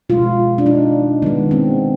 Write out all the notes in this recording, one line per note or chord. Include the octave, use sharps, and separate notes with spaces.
B2 G#3 F4
D4
D#4
D#3 G#3 B3
C4